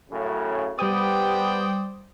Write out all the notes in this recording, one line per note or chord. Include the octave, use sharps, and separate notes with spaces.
F#2 A2 C#3
G3 B3 G4 C5 D5 G5 D#6